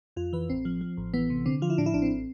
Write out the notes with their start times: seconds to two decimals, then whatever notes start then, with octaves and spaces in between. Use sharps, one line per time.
0.16 F2 F4
0.33 E3 B4
0.49 A1 C4
0.65 F3
0.81 F3
0.97 A1
1.14 E3 B3
1.30 C3
1.46 D3 C4
1.62 F3 F4
1.70 E4
1.78 A2 D4
1.86 E4
1.94 A1 D4
2.02 C4